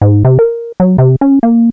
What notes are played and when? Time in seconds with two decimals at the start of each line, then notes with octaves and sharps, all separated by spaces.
0.01 G#2
0.25 C3
0.39 A#4
0.80 F#3
0.98 C3
1.21 C#4
1.43 A#3